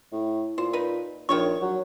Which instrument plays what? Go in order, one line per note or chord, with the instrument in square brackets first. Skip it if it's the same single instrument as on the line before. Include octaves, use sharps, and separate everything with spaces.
[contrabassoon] A2
[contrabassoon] A#2 [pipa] C5
[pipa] D#4 B4
[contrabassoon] A#1 [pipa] D#3 C#5 C#6
[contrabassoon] F#3